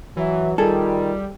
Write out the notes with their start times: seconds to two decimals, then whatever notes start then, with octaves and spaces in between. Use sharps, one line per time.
0.17 E3 F#3 E5
0.58 D#3 G3 F4 G#4 A4